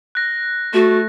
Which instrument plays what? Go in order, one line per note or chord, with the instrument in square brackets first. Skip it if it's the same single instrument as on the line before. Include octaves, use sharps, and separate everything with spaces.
[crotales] F#6 A#6
[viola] A3 [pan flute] F#4